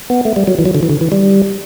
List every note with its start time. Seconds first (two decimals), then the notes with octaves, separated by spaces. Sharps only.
0.10 B3
0.25 A3
0.36 G3
0.47 F#3
0.59 E3
0.65 F#3
0.75 D3
0.83 E3
0.90 D3
1.01 E3
1.12 G3